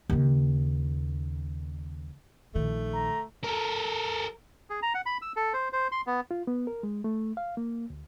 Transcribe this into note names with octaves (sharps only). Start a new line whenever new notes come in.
D#2 C#3
A#1 D#3 A3
A#5
A4 A#4
G#4
A#5
F#5
B5
E6
A4
C5
C5
C6
B3
F4
B3
A#4
G#3
A3
F5
A#3
D2